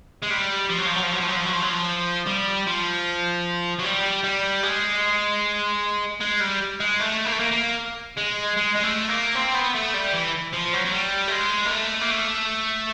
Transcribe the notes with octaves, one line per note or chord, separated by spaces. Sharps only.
G#3
G3
F3
F#3
F3
F#3
F3
F#3
F3
F#3
F3
F#3
F3
F#3
F3
G3
F3
F#3
G3
G3
G#3
G#3
G3
G#3
A3
A#3
A3
A#3
A#3
G#3
G#3
G#3
A3
A#3
C4
B3
A3
G3
E3
F3
F#3
F#3
G3
A3
G#3
A#3
A3
A#3
A3